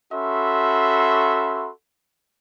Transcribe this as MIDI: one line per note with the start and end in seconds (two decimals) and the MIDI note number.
0.14 1.70 61
0.14 1.70 66
0.14 1.70 69
0.14 1.70 76
0.14 1.70 83
0.14 1.70 84